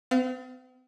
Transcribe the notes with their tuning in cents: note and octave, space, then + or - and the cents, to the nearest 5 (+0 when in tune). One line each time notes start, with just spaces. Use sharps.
C4 -45 F5 +0